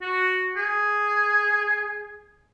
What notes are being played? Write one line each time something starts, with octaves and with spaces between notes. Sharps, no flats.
F#4
G#4